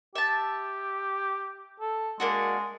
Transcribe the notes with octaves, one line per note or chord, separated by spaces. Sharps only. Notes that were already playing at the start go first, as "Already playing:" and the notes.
G4 E5 A5
A4
G#3 A#3 D4 F#4